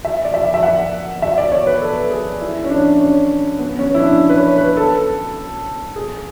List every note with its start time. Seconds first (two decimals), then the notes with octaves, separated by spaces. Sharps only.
0.05 E5
0.25 D5
0.34 E5
0.54 E5
0.63 F#5
1.22 E5
1.38 D5
1.52 C#5
1.67 B4
1.82 A4
2.11 G#4
2.41 E4
2.64 C#4
2.70 D4
3.00 C#4
3.59 B3
3.79 C#4
3.94 E4
3.98 D4
4.30 B4
4.37 C#5
4.58 B4
4.77 A4
5.96 G#4